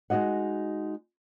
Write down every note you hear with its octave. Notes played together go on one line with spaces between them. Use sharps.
G#3 D#4 F#4 D#5 F#5